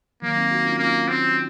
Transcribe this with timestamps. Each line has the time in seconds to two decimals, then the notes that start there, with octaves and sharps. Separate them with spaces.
0.22 D#3 F#3 A#3
0.37 C4 D#4
0.51 D#4 F#4
0.65 C#4 F4
0.79 A#3 C#4 F4
1.08 C4